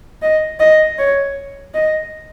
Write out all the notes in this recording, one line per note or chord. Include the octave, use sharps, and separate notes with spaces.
D#5
D#5
C#5
D#5